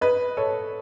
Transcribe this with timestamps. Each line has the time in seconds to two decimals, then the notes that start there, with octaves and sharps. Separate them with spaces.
0.01 B4 D#5
0.37 A4 C#5